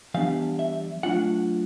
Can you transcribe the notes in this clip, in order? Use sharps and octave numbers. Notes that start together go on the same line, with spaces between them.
E3 G3 B3 D4 F5
E5
F#3 A3 D4 F4 F#5